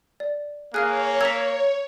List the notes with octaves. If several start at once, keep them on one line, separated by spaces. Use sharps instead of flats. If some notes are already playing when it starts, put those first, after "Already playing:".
D5
A#3 G#4 C#5 F5 F6 F#6
A#5 E6 G#6 B6